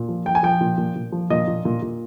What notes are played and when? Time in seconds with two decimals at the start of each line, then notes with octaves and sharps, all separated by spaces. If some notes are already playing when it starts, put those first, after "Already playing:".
Already playing: A#2
0.09 F3
0.26 F3 G5
0.35 G#5
0.43 F3 G5
0.61 A#2
0.78 A#2
0.95 A#2
1.12 F3
1.30 A#2 D#5
1.48 A#2
1.65 A#2
1.82 A#2